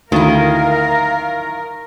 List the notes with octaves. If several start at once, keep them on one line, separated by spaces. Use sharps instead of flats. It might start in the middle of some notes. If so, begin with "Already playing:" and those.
D2 D#3 E4 A#4 F5